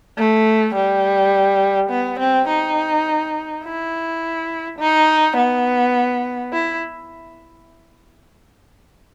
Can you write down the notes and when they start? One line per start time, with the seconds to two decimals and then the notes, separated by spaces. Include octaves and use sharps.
0.18 A3
0.75 G3
1.90 B3
2.19 C4
2.48 D#4
3.64 E4
4.79 D#4
5.37 B3
6.53 E4